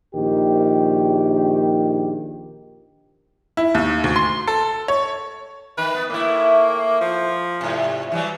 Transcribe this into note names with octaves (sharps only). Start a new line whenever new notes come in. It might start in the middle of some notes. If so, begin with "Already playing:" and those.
A#1 D#3 G4
E4
D#2
D2
C6
A4
C#5
D#3 B4
B3
A2 A#3 E4
F3
G#2 C3
E3 F#3 G3